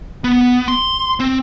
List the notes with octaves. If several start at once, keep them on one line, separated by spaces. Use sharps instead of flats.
B3
C6
C4